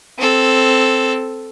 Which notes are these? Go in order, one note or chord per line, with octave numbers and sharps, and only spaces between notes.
C4 A4